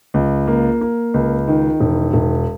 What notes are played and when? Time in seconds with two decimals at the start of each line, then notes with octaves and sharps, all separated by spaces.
0.14 C#2
0.47 A#3
0.81 A#3
1.14 C#2
1.48 D#3
1.80 E1
2.13 E1